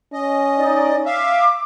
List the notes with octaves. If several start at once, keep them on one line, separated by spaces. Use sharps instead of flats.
C#4 D#5
D#4 D5
E5 F5 D6